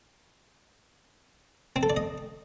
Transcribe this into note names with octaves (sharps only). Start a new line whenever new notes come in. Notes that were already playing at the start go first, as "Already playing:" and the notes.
C4
A4
D5
D#5